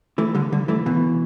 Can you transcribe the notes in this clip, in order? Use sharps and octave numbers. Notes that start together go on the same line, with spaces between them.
E3 A3
D3 G3
D3 G3
E3 A3
B2 E3